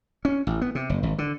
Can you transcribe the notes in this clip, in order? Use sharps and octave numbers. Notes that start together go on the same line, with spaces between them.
C#4
A1
B3
C3
F#1
G#1
D3